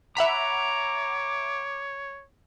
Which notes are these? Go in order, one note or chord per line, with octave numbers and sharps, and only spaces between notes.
C#5 E5 F#5 A#5 B5 D6